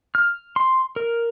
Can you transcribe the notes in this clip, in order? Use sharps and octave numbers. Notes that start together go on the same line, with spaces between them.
F6
C6
A#4